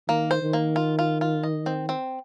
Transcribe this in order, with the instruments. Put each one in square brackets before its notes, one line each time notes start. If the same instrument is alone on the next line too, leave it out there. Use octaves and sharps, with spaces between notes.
[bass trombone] D#3 [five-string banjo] A#3
[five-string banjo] C5
[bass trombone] D#3
[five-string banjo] A#3
F4
F4
F4
D#5
C4
C4